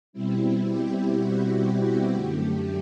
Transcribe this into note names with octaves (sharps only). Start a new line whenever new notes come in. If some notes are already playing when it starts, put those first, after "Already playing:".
B2 G3 C4 E4
G4
F#4
F#2 D3 A3 G4